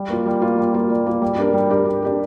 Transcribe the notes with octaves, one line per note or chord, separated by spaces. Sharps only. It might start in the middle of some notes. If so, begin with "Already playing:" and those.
Already playing: G3
A#3 F4
G3
A#3 F4
G3
A#3 F4
G3
A#3 F4
G3
D4 G4 A#4
G3
D4 G4 A#4
G3
D4 G4 A#4